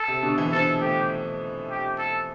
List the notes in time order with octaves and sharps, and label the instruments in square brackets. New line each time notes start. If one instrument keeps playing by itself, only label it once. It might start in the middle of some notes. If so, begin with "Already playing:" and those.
Already playing: [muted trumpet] A4
[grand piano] C3
B2 D3
C3 E3
[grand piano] D3 F3 [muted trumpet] A4
[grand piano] F3 A3 [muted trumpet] G4
[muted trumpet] G4
A4